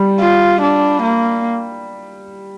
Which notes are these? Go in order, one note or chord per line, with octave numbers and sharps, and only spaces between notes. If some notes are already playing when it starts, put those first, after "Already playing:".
Already playing: G3
F4
D4
A#3